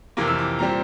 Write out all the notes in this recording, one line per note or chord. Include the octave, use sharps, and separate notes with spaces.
F2 C3 E3 A#3 D6
E6
D6
A#2 G3 C4 A#5